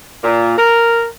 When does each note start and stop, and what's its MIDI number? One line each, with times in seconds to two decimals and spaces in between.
0.23 0.56 46
0.58 1.05 70